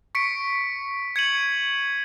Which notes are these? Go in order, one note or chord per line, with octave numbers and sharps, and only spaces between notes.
C#6 B6 C#7 D7
G#6 C#7 D#7 F#7